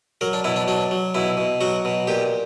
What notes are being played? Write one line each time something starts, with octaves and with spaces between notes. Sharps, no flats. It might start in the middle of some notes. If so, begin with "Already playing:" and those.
F#3 A#4
D4
B2 E4
D4
F#3 D4
F#3
B2 E4
B2
F#3 F#4
B2
A#2 G4